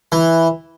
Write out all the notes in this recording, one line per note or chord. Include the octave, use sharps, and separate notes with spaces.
E3